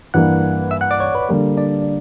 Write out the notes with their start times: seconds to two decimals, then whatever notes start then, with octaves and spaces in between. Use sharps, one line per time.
0.14 G2 E3 A#3 F#5 F#6
0.71 E5 E6
0.81 F#5 F#6
0.91 D5 D6
1.00 C#5 C#6
1.15 B4 B5
1.29 D3 G3 A#3
1.57 D4 D5